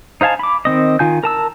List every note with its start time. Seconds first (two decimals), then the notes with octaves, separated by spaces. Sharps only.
0.21 D#4 C5 F5 G#5 A5
0.39 B5 D6
0.65 D#3 C4 D#5
0.99 D#3 F4 G#5 G6
1.23 A#4 A5 E6